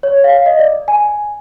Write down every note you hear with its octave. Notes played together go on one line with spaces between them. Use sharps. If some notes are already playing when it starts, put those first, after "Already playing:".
C#5
F5
D#5
D5
G#5